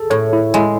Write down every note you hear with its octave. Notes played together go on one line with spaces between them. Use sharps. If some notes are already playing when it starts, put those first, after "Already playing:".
Already playing: G#4 A4
A2 C#5
E4
G#3 E4